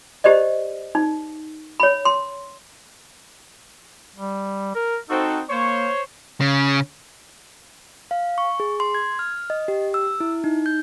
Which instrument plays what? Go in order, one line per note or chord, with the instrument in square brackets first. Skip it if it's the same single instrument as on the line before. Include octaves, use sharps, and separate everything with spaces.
[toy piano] G4 C5 D5 D#5
D#4
C#5 B5
C6
[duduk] G3
A#4
[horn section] C4 F#4 A4 [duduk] D#4
[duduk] A#3 [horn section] C5 C#5
[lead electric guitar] C#3
[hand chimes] F5
C#6
G#4
C6
G#6
F6
D#5
G4
E6
E4
D#4
G6